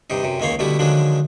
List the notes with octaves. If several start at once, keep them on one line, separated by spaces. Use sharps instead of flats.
G2 C3 D#4
F#2 C3
C#2 D#3 A#3 C#5 C6
B2 D3 G3 A3 E4
D3 D#3 F3 F#3 G#3 D4